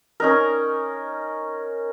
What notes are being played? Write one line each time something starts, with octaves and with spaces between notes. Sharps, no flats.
C#4 D#4 A#4